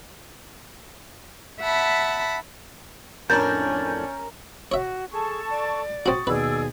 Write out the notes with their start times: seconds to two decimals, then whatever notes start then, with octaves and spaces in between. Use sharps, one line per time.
1.60 E5 F#5 A5 B5
3.30 F2 A2 C#4 D4 A#4 G6 A6
4.72 F#4 C#5 E5
5.12 G#4 A4 A5 C#6
5.50 D5
6.06 C4 F#4 C#6 D#6 A6
6.27 D#2 B2 G#4 B4 D5 E6